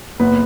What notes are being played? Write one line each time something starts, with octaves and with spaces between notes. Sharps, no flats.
F#1 B3 B4